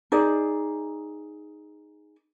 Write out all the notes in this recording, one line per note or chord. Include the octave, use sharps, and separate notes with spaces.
D#4 G#4 D5